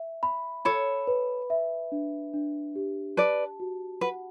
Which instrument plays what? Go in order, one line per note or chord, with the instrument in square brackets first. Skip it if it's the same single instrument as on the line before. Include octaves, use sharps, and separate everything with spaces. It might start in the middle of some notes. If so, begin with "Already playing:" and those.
Already playing: [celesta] E5
B5
[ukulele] A4 C#5 [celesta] B5
[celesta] B4
E5
D4
D4
G4
[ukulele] B4 D5 [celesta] A5
[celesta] F#4
[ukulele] B4 [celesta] F#5